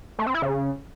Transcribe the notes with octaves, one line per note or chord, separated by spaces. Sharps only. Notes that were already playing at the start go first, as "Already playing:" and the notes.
A3
C4
E4
C#3